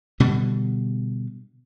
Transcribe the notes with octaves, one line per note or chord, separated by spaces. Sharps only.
B2 D3 G3